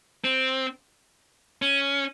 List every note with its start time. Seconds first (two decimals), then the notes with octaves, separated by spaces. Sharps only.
0.24 C4
1.62 C#4